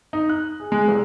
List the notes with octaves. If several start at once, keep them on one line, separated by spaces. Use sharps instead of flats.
D#4
F#6
G#4
G#3
C2